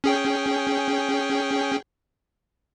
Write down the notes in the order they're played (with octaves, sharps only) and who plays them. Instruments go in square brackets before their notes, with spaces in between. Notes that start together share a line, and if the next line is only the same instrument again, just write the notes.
[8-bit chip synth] C#4 G#4 G5